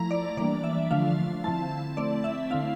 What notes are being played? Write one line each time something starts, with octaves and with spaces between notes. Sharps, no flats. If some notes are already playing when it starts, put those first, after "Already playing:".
Already playing: F3 A3 E4 A#5
D5
E3 G3 A#3 D4 D5
E5
D3 F3 A3 D4 F4 F5
D3 F3 C4 E4 A5
A3 C4 E4 D5
E5
D3 A3 C4 E4 F5